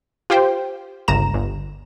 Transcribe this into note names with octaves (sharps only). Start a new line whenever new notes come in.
F4 G4 C5 G5
G1 C#2 A#5 E7
G1